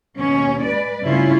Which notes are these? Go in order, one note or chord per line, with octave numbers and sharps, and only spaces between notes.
D#2 B2 C#4
G#3 B4 D5
G2 C#3 A3 C#4 E4 F4